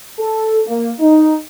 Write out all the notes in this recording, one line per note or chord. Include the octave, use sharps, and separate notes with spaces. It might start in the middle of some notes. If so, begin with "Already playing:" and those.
A4
A#3
D#4